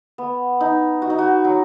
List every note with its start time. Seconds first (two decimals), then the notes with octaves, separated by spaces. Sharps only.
0.18 B3
0.61 D#4
1.02 F#4
1.10 D#4
1.18 F#4
1.44 F#3